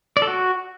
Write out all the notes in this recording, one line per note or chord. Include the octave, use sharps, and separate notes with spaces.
D5
A4
F#4